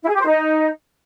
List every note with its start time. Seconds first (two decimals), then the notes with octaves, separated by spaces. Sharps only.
0.03 E4
0.08 G#4
0.14 G4
0.20 C5
0.25 D#4